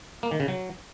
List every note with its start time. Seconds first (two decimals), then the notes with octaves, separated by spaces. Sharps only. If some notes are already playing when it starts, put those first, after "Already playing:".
0.23 A#3
0.31 D#3
0.40 C#3
0.48 F#3